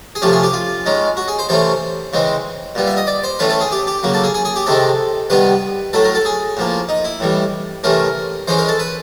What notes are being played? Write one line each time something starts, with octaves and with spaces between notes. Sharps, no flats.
G#4
C3 F3 A3 C#4 G4
G#4
G4
F4
D#3 G#3 C#4
F#4
G#4
C5
C3 E3 A3 C#4 C5
C#3 E3 G#3 C4
A#2 G3 B3
E5
D#5
D5
C5
A2 E3 A3 C#4 B4
A4
G#4
G4
G4
C#3 F#3 A#3
A4
G#4
G#4
G#4
G4
C3 D#3 G#3 C4 A4
C3 D#3 G3 B3 B4
A2 F#3 A3 A4
A#4
A4
G#4
A2 F3 A#3
D#4
E4
A2 E3 G3
C3 E3 A3 C#4 A#4
E3 G#3 C#4 C5
A#4
A4
B4